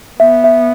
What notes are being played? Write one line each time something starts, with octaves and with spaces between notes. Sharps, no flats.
B3 E5
E5